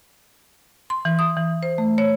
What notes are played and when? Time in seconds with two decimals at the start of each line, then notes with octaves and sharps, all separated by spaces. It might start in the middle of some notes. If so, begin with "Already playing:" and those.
0.90 C6
1.05 E3
1.19 D#6
1.36 E3
1.63 C5
1.78 A3
1.98 C#5